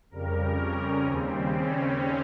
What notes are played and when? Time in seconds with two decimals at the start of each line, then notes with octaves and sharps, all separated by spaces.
0.11 F2 C#3 G3 A#4
0.59 C#4
1.06 D#2 C#3 G3 C4
1.55 C#4